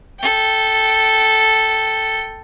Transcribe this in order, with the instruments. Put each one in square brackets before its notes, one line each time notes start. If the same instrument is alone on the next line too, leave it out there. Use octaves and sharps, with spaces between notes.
[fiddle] A4 G5